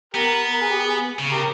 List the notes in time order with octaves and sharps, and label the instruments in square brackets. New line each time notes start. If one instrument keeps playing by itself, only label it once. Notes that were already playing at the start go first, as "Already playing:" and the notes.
[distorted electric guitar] B3 [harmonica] G4 A#4
[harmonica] A#4
G#4
G4
G#4
[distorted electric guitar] C#3
[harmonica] G4 A#4